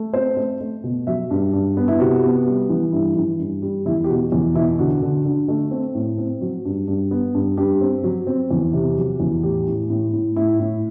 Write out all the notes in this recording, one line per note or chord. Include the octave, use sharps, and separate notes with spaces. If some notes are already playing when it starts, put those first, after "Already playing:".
Already playing: A3
C4 C5
A3
A3
B2
F#3 E5
G2
G2
B3
E4
C3 F#4
B3
G3
E3
G2 E4
E3
G2
G3
E2 E4
G4
B2 F#4
E2
B2 E4
D3 F#4
D3
D3
A3
C4
A2
C4
F#3
G2
G2
B3
G2
G2 G4
C4
F#3
C4
E2
C3
F#3
E2
A2 G4
A2
A2
A2
A2 E4
A2